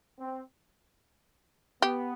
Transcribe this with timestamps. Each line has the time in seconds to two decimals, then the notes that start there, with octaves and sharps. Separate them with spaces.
0.19 C4
1.82 B3 G4